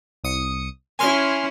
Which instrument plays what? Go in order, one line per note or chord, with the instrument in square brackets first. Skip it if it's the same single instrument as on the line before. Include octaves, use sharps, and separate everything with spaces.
[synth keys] C2 D#6 C#7
[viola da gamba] C#4 E4 [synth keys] G#5 C6 F6